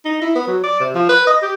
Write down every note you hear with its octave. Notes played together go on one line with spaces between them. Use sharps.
D#4
E4
B3
F#3
D5
C3
F3
B4
D#5
G4